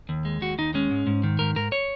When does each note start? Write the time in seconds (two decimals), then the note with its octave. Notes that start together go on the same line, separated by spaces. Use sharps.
0.09 D#2
0.25 G#3
0.41 D#2 F#4
0.58 D#2 D#4
0.74 G#3 C#4
0.91 G#2
1.07 G#2
1.23 D#3
1.39 G#2 A#4
1.56 G#2 A#4
1.72 C#5